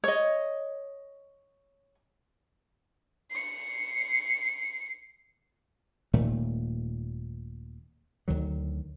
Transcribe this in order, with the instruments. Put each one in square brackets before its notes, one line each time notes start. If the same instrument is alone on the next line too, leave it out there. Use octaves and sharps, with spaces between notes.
[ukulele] C#5 D#5
[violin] C7 C#7
[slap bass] D#1 A#2 D#3 A3
D2 D#3 F#3